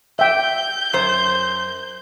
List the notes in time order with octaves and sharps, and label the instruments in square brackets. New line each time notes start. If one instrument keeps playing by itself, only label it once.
[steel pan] E5 G5 [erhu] G6
[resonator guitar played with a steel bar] F#2 C5